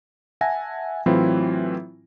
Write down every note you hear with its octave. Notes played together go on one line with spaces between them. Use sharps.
E5 F#5 G#5 A5 A#6
A2 E3 F#3 C4 E4 F4